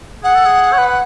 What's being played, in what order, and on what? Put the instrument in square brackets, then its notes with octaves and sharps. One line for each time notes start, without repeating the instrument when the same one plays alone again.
[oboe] G#4 [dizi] F#5
[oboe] A4
G#4
C#5
B4